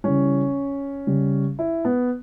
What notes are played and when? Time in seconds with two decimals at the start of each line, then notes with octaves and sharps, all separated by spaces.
0.04 C#3 E3 G3 C#4
1.07 C#3 G3
1.59 E4
1.85 B3